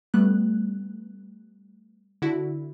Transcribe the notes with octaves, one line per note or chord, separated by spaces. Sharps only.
G3 A3 B3 F#6
D3 E4 F#4